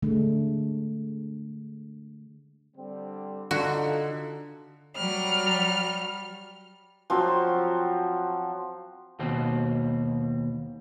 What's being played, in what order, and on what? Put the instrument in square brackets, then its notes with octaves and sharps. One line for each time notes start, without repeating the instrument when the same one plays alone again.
[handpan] D3 G#3 A3
[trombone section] D3 G3 C4
[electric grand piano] D3 [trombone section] D#4 F4 A4 [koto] F#4
[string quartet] F#3 G3 F6
[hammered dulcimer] F3 F#3 C4 F#4
[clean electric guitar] D#2 B2 C4